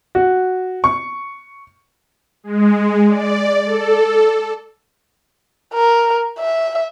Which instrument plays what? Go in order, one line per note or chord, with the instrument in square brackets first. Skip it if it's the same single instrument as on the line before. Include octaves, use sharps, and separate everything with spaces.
[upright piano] F#4
C#6
[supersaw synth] G#3
D5
A4
[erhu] A#4
E5